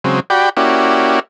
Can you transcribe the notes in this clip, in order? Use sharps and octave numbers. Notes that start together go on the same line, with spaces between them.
C#3 F#3 G#3 C4
F#4 G4 D5 G5 B5
A#3 C#4 E4 F#4 G4 D5